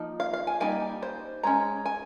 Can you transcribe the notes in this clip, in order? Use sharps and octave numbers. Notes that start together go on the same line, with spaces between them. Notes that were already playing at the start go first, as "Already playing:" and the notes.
Already playing: F3 A#3 D#4
F5
F5
G#5
G3 A#3 D#4 G#5
C5
G#3 C#4 A#5
G#5